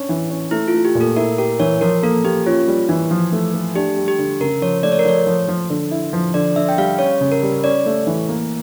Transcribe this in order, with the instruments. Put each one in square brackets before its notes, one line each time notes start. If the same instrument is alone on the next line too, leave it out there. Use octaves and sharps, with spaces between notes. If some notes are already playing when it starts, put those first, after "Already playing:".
Already playing: [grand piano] C#4 D4
E3
C#4
[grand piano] A3 [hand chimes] E4
[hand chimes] F4
[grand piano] A3
[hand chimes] G4
[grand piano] A#2
[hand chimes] A4
[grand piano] E4 [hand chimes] A#4
[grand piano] G4 [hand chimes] A#4
[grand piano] E3 [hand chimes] C#5
[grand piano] F3 [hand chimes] A#4
[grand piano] A#3 [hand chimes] A4
[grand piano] A#3 [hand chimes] G4
[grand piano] C#4 [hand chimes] F4
[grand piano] G3
E3
F3
A3
A3
[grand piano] D4 [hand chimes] G4
[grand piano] G3
[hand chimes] G4
[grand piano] D3
[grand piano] C#3 [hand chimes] A#4
[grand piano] F3 [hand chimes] C#5
[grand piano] A3 [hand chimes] D5
[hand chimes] C#5
A#4
[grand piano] F3 [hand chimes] C#5
[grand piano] F3
F3
D3
E4
F3
[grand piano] D3 [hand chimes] D5
[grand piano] D3 [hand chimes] E5
[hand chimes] G5
[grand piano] G3 [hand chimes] F5
[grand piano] C#4 [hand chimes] C#5
[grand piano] C#3
[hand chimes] A#4
[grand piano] G3
[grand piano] C#4 [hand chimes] D5
[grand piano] A3
E3
A#3